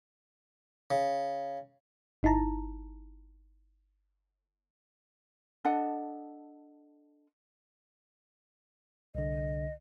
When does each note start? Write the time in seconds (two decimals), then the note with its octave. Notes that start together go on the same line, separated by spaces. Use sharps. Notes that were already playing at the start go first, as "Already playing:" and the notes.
0.91 C#3
2.23 G1 D#4 E4 A5 A#5
5.65 D4 A4 D#5 F#5
9.15 C2 D3 D#5